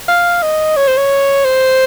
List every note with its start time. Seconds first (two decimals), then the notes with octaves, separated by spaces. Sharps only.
0.08 F5
0.43 D#5
0.76 C#5
0.87 C5
0.97 C#5
1.44 C5